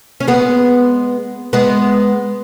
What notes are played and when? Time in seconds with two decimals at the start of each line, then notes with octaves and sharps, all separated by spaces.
0.20 C#4
0.28 G#3 B3
1.53 G#3 B3